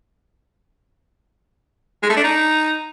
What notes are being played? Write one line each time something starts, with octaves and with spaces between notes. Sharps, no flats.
G#3
A3
D4
D#4